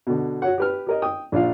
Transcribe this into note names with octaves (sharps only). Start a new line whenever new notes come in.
B2 D3
F#4 C#5 F#5
G4 B4 F6
G4 A#4 D#5
G5 D#6
A#1 D4 F4 F5